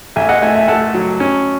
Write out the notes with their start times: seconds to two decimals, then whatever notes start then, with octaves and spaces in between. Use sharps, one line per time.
0.16 A1 E5 G#5
0.29 D#5 F#5
0.42 A3 E5 G#5
0.55 E5 G#5
0.68 A3 F#5 A5
0.94 F#3
1.20 C#4